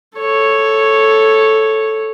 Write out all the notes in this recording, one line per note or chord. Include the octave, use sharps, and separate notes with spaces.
A4 C#5